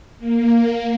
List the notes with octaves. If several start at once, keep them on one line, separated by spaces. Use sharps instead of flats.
A#3